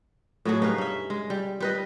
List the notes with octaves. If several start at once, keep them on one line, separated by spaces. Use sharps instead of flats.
A2 F#3 A3 G#4
G2 D#4 B4 F5
C#4 E5
G#3
G3
G3 B4 D#5